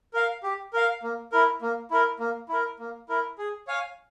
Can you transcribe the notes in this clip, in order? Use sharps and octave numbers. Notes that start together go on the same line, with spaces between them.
A#4 F5
G4
A#4 F5
A#3
E4 A#4
A#3
E4 A#4
A#3
E4 A#4
A#3
E4 A#4
G#4
C#5 F5 G#5